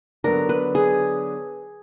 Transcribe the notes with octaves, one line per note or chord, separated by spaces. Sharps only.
D3 F#3 B3 D4 A#4
B4
G#4